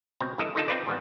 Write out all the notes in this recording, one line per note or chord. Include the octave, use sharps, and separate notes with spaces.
C#2 B2 C4 A#5
G2 E3 A4 A#4 D#5 E5
D3 D#3 D#4 F4 A4
C4 D#4 F4 B4 D5
G#2 D#3 G3 B3